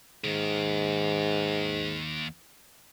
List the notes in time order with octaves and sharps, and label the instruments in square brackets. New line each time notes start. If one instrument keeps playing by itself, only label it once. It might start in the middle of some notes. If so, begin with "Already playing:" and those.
[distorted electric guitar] D#2 D#3 [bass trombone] G#2